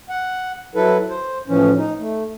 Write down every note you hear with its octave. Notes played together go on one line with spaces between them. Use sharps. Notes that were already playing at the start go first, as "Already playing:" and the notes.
F#5
F#3 E4 A4 B4
C5
A2 E3 F3 C#4
D#4
A3